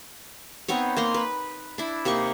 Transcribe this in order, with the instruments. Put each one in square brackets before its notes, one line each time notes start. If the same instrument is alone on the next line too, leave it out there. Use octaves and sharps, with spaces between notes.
[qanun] B3 C4 D#4 C#5
A#3 A#5 C6
B4
D4 E4
C3 A#3 D#4 C#6